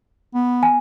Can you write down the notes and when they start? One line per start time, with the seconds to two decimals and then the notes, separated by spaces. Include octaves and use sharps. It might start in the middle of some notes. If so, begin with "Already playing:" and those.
0.34 B3
0.63 G#5